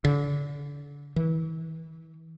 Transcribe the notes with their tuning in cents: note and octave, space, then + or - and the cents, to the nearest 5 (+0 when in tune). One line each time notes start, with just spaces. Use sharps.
D3 -35
E3 -30